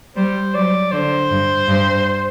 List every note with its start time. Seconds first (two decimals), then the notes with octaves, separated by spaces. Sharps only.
0.16 G3 C5
0.54 F#3 D5
0.92 D3 C5
1.31 G2
1.68 G2